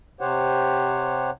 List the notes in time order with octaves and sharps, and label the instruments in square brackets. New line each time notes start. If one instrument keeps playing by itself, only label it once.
[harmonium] C3 G4 C5 C#5 F#5